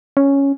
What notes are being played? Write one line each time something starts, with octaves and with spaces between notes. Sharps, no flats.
C#4